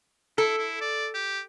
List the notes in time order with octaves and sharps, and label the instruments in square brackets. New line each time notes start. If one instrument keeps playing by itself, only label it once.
[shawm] E4 [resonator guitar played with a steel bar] A4
[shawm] E4
D5
G4